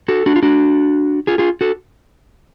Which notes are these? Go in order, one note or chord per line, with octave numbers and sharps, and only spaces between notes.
F#4 A4
D4 F#4
F4
D4 F#4
F4 G#4
F4 G#4
F#4 A4